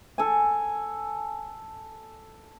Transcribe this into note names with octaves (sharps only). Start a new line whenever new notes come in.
A4 G#5